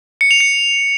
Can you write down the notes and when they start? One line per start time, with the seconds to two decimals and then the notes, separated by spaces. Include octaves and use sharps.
0.21 C#7
0.31 F7
0.40 C#7